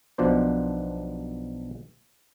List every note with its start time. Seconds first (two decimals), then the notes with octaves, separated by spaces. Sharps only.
0.18 B1 B2 F3 D4 C5